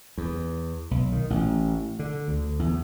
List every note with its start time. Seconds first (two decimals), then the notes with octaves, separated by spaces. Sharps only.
0.18 E2
0.91 B1
1.12 D#3
1.30 A1
1.99 D3
2.28 D2
2.59 E2